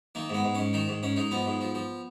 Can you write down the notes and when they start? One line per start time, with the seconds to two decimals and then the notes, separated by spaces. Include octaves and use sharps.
0.15 D#3 A#3
0.29 G#2 B3
0.44 G#2
0.55 G#2 C#4
0.73 D#3 D#4
0.88 G#2
1.03 G#2 C#4
1.16 G#2 D#4
1.31 F3 B3
1.46 G#2
1.61 F3
1.75 F3